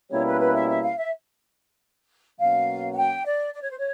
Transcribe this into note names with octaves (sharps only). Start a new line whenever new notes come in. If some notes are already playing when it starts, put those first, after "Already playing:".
B2 G3 A#3 C#4 E4 C#5
B4
B4
E5
E5
F5
E5
B2 F#3 A#3 C#4 F#4 F5
F#5
G5
D5
D5
C#5
C5
C#5